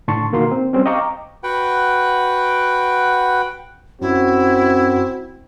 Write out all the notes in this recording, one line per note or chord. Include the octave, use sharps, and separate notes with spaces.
A2 D3 A5 C6 C#6
B2 D#3 A#3 F#4 C6
C4
G3 C4 C#4
D#5 F5 G5 A#5 C#6 D6
F#4 B4 F#5 G5
F#2 C4 E4 F#4